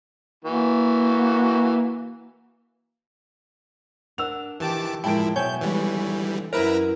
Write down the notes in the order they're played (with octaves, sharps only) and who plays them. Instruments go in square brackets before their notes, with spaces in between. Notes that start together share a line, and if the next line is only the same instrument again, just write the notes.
[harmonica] E3 F#4 [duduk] A#3
[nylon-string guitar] D4 A#4 F#5 [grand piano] E6 F7
[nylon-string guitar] D#3 [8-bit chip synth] E3 A5 D6 [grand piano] G4
[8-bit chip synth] A2 E4 [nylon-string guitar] F3 G#3 A#4 [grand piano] G5 A5 D7
[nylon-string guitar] B2 F#3 E5 [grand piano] C#5 G#5 [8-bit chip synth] G6
[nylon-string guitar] D3 G#3 B3 [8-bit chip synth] E3 G3
[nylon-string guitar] F#2 E3 [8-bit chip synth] E4 B4 A#5 [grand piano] A#4